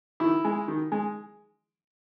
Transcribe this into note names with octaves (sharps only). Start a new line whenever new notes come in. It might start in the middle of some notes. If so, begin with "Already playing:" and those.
D#3 E4
G#3
D#3
G#3